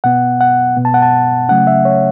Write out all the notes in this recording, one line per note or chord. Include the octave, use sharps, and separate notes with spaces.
B2 B3 F#5
F#5
B2 B3
A5
F#5
A5
C#3 F#3 A3 C#4 F#5
E5
C#5